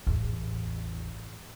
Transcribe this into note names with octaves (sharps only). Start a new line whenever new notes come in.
A1 E2